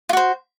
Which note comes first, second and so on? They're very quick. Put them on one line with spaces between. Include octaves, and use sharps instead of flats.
F4 F#4 C5